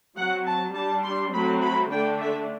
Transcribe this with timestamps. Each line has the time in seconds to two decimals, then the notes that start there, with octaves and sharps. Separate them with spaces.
0.17 F#3 C4 F#5
0.46 A5
0.75 G3 D4 A5
1.04 C6
1.32 F#3 A3 C4 B5
1.62 B5
1.91 D3 A3 D4 G5
2.20 E5